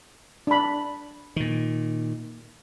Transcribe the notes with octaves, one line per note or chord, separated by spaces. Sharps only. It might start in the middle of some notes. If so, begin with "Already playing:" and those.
D4 B5
A#2 D#3